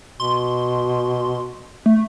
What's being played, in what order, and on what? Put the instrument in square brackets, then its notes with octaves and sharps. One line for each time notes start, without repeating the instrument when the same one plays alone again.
[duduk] B2 [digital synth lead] C6
[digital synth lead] A3